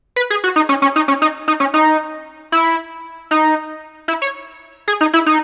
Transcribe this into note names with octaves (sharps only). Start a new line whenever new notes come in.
B4
G#4
F#4
D#4
C#4
C#4
D#4
C#4
D#4
D#4
C#4
D#4
E4
D#4
E4
C#5
G#4
D#4
E4
D#4